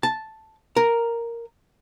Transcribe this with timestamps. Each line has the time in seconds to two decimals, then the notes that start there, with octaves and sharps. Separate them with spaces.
0.03 A5
0.76 A#4